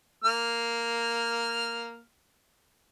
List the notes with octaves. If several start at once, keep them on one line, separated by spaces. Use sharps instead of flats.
A#3 F6